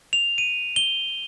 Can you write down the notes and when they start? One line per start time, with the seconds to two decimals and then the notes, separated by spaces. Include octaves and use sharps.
0.13 F7
0.38 D#7
0.76 G7